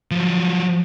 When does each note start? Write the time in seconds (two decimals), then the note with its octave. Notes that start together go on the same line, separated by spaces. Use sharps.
0.11 F3 F#3